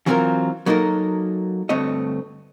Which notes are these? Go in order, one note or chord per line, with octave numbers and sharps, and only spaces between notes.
E3 F#3 C4 D4 F4 A#4
F#3 A#3 D#4 A4 A#4
D2 G2 A3 C4 C#5 D#5